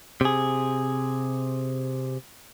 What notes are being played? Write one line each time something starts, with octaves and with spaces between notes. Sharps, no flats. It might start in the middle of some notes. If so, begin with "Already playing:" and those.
C3 G#4